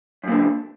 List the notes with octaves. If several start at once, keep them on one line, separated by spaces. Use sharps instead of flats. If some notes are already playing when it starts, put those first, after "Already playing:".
F#2 A#2 D3